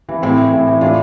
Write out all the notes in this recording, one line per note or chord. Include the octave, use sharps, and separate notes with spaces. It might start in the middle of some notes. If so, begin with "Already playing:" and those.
E3
A2 C4 E4
E3
A2
E3
A2 D4 F4